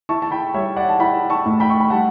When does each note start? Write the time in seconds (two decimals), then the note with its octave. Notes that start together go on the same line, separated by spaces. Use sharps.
0.09 E4 A5 C#6
0.22 A5
0.31 G5 B5
0.54 G3 C#5 E5
0.76 D5 F#5
0.89 A5
0.99 E4 G5 B5
1.30 A5 C#6
1.46 A2
1.60 G5 B5
1.70 C#6
1.80 B5
1.90 G3 F#5 A5